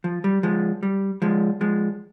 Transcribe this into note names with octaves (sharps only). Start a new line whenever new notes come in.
F3
G3
F3 G#3
G3
F3 G#3
F3 G#3